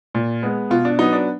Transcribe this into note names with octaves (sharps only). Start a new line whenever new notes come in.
A#2
G#3 B3
B2 F4
D4
F#3 B3 D#4
D4